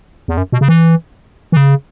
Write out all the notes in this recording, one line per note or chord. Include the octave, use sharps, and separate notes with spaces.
E2
F#2
B2
C#3
E3
E3
C#3